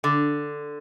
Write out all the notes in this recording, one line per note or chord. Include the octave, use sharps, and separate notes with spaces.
D3